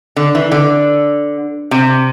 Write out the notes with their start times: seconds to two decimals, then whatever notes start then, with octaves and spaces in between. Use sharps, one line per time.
0.16 D3
0.35 E3
0.52 D3
1.71 C3